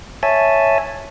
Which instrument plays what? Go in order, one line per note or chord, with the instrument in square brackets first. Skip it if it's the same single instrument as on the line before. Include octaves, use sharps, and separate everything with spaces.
[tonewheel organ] C#5 E5 G#5 A5